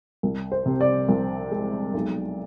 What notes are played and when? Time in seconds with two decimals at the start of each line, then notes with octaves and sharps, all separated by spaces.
0.23 C2
0.52 C5
0.66 C3
0.81 D5
1.09 C2
1.51 G#3
1.94 B1